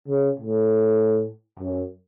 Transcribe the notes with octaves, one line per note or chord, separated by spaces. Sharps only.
C#3
A2
F#2